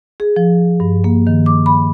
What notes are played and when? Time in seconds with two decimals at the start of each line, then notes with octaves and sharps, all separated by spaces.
0.20 G#4
0.36 F3
0.80 G2
1.04 A#3
1.27 D#3
1.46 D6
1.66 B5